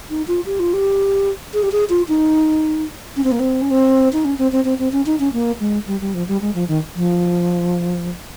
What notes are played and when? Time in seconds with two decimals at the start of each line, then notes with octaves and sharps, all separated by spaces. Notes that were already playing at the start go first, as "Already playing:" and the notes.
0.10 D#4
0.28 F4
0.46 G4
0.59 F4
0.73 G4
1.54 G#4
1.63 G4
1.72 G#4
1.90 F4
2.09 D#4
3.16 C#4
3.24 C4
3.32 A#3
3.40 C4
3.62 C#4
3.71 C4
4.13 D#4
4.25 C#4
4.38 C4
4.52 C4
4.65 C4
4.79 C4
4.92 C#4
5.06 D#4
5.19 C#4
5.33 A#3
5.60 G#3
5.87 G3
6.01 G3
6.14 F3
6.28 G3
6.41 G#3
6.55 F3
6.68 D#3
6.96 F3